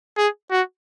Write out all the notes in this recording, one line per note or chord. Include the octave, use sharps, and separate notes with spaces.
G#4
F#4